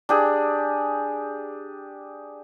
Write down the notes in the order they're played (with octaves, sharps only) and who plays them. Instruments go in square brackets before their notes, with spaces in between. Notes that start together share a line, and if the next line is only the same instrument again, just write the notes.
[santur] D4 G4 G#4